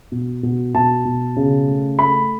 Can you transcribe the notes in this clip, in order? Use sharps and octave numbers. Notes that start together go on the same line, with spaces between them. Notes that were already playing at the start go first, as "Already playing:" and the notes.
B2
B2
B2 A5
B2
C#3
A3
A3 B5